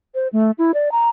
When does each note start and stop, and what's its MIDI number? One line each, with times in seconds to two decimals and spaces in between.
0.15 0.28 72
0.33 0.51 57
0.58 0.72 64
0.74 0.92 74
0.92 1.09 82